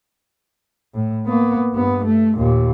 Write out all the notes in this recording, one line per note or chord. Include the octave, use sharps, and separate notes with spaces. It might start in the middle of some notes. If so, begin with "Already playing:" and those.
A2
A#3 B3
G2 B3
A3
D#2 A#2